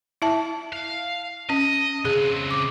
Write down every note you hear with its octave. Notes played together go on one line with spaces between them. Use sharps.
E4 E5 A5
F5
C#4 D#5
C#3 C4 G#4
D6